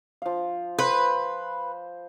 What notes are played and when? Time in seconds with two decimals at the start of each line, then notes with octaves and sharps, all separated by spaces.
0.22 F3 F5
0.79 B4 C5